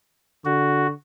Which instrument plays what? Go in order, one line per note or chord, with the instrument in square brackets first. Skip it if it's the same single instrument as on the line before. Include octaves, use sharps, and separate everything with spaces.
[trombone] D3 [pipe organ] F#4